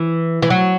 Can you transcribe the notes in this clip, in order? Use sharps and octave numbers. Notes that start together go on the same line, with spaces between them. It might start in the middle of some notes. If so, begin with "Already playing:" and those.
Already playing: E3
E3
F#3